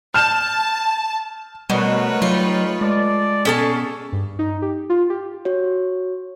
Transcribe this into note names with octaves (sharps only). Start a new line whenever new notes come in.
A5 F6 G6 E7
B2 G3 A3 F#4 A#4 B4 C#5
F#3 G3 D#4 F4
G#3 A4 D5
B2 C#4 G#4 A4 A5
G2
D#4
G4
F4
G4
F#4 C#5